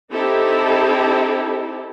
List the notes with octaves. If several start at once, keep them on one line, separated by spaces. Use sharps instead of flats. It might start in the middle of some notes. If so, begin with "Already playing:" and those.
C4 D#4 E4 G4 A4